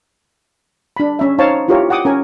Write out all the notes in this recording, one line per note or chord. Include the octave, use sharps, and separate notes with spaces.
D4 B5
C#4 E5
D#4 C5 C#5 F5 A5
E4 F4 G4 A#4 C#5
F#5 G5 D6 D#6
C#4 A#4 G#5